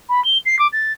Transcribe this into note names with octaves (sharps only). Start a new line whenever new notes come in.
B5
G7
C7
D6
A6